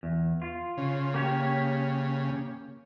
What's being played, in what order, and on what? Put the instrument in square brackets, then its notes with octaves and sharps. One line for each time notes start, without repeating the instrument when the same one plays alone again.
[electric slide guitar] E2
F4
[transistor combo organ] C#3
[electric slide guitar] A#3 G4 C#5